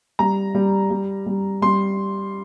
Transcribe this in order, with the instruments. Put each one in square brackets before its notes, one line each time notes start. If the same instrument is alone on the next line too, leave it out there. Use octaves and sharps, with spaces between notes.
[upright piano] G3 A#5
G3
G3
G3
G3 C6